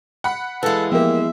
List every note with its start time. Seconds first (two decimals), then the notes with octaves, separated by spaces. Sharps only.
0.24 F#5 B5
0.63 E3 G#3 A4 B4 F5
0.92 F3 A#3 B3 G4 E5